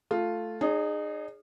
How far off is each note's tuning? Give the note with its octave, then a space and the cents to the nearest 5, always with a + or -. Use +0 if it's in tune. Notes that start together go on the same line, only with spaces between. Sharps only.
A3 +0 F4 +0
D#4 -35 G#4 +0 C#5 +15